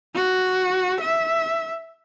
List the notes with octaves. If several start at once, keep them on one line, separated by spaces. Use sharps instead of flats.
F#4
E5